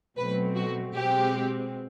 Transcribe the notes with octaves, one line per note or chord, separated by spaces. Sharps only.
B2 F#3 A3 C4 B4
F#4
B2 G#3 C4 G4